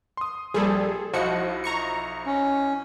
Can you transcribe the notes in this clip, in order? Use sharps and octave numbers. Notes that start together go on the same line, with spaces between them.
C6 D#6
A#1 G3 G#4 A4
B1 F3 E4 F#4 D#5 C#7
A#5 C#6 C#7
C#4